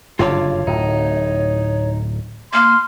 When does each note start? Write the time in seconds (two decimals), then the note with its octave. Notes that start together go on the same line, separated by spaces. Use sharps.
0.19 F#1 G2 D3 F4 C#5 D6
0.67 D1 A2 D#4
2.53 A#3 C6 F6